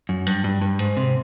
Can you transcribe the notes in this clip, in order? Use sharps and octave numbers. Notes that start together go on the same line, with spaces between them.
F#2
G2
G2
G2
G#2
C3